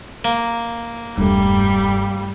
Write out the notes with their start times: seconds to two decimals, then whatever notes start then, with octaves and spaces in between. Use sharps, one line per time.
0.25 A#3
1.18 E1 G2 G3 A3